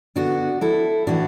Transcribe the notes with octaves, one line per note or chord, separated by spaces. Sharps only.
D3 B3 D4 F#4
E4 A4
A2 E3 A3 D4 F#4